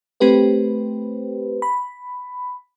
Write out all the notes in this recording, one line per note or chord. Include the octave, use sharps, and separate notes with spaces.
A3 C4 G4 B4 C5
B5